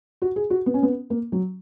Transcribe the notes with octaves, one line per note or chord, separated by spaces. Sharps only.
F#4
G#4
F#4
B3
C#4
B3
A#3
F#3